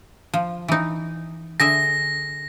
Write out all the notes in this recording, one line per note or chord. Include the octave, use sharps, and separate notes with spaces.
F3
E3 D#4
D3 G#4 E5 A#6